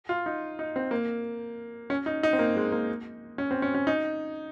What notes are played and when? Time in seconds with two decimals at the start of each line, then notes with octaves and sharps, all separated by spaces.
0.09 F4
0.26 D#4
0.59 D#4
0.76 C4
0.91 A#3
1.90 C#4
2.06 D#4
2.23 D#4
2.33 C4
2.39 A#3
2.56 G#3
2.72 A#3
3.38 C#4
3.51 C4
3.62 C#4
3.75 C#4
3.87 D#4